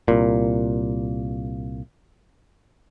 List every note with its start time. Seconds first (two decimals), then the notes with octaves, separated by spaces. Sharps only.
0.08 C2 A#2